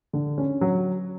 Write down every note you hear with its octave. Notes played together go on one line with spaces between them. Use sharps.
D3
C#4
F#3